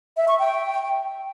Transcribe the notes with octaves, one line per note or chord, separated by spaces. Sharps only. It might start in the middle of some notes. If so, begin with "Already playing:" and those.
E5
C#6
G5